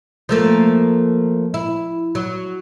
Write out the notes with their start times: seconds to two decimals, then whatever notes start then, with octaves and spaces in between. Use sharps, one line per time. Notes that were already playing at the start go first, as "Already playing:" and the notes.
0.29 F3 A3 A#3
1.54 E4
2.15 F#3